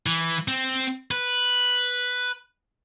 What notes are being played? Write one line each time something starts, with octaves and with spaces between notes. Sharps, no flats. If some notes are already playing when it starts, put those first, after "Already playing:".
E3
C4
B4